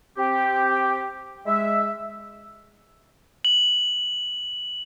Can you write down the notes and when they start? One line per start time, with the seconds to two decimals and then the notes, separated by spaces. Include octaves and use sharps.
0.17 C4 G4
1.46 G#3 E5
3.45 F#7